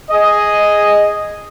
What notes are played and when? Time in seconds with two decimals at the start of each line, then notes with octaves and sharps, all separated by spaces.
0.10 G#4 D#5